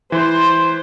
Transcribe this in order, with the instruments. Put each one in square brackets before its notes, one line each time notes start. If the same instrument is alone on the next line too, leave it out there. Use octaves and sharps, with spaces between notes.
[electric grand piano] E3 [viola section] C5